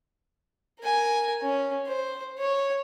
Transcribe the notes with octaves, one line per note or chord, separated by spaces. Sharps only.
A#4 G#5
C#4
C5
C#5